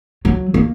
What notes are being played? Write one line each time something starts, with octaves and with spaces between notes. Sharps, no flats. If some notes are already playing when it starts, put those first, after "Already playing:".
F#3
A#3